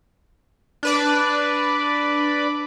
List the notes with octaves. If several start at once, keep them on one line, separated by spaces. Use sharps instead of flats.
D4 B4 D5